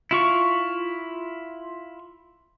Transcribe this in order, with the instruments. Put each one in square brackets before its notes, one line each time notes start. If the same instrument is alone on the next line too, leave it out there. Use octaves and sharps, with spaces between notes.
[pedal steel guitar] E4 F4 C#6